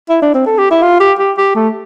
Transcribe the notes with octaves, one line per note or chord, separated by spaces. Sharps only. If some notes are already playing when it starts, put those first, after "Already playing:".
E4
D4
C4
A4
G4
E4
F4
G4
G4
G4
A3